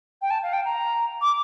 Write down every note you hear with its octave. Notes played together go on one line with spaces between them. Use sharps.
G5
A5
F5
G5
A#5
D6